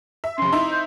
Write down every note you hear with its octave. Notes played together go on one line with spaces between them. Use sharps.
E5
F1 C#4 C6
D#4 E4
C5